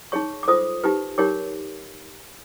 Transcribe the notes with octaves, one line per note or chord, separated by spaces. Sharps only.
D#4 G#4 C#5 C#6
D6
F4 A4 C5 D#6
D#4 G4 B4
D#4 G4 A#4 C#5 D6